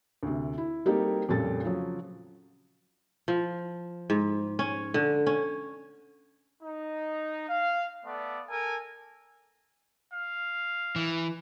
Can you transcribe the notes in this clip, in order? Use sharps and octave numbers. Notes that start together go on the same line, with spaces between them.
D2 C3
E4
G3 A#3 C4 D#4 G4 A4
F2 A#2 C#3 G3 A4 A6
C#3 F3 F#3
F3
G#2
C#4
D3
C#4
D#4
F5
A3 B3 D5
A4 A#4 G#5
F5
E3